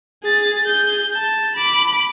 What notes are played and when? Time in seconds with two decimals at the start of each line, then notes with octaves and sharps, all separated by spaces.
0.23 G#4 A6
0.64 G#4 G6
1.15 A5
1.56 B5 D6